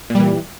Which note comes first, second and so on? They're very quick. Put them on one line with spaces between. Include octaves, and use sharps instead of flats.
A#2 G3 E3